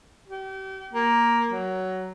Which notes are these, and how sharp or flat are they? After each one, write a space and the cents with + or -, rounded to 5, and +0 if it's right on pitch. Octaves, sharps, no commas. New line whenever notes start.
G4 -35
A#3 +5
F#3 +15